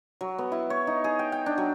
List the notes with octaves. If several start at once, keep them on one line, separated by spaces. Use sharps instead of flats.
F#3
B3
E4
C#5
D#4
G#4
G5
G5
D4
F#3